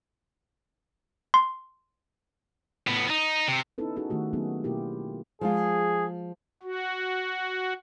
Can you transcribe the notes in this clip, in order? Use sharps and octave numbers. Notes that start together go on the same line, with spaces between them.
C6
A2 B3
D#4
C3
B3 C#4 D#4 E4 A4 B4
C#4 D#4 F#4 G#4 A4
D#3 A3 F#4 G4
F#3 A#3 B3 C#4 D#4 G#4
B2 A#3 E4 F4 G4 A#4
F3 G#3 F4 G#4
F#4